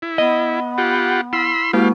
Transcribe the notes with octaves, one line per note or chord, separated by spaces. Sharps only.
E4
B3 D#5
F4 G4 F#5
E4 B5 C6 E6
G#3 A#3 E4 F#4 G4 F5